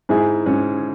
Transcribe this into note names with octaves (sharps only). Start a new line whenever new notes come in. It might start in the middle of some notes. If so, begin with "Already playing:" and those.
G#2 E4 G#4
G#2 C#4